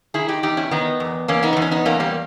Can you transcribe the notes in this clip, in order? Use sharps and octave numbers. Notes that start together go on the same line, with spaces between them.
D#3 E4 G#4
D#4 G4
E2 D#4 G4
C#4 E4
D#3 B3 D#4
E2
E2 A#3 C#4
B3 D#4
B3
E2
C#4
B3 D#4
E2 A#3 C#4
G3 A#3